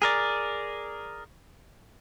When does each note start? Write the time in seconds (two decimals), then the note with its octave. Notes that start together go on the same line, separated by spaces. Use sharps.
0.02 G#4 A#4 D5